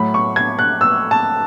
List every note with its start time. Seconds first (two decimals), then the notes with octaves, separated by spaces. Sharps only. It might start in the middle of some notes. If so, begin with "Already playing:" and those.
Already playing: A2 F#3 B5
0.14 C#6
0.36 G#6
0.59 F#6
0.81 E6
1.11 A5